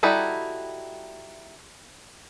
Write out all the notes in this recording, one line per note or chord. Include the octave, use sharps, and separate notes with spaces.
G3 D#4 E4 F#4 A4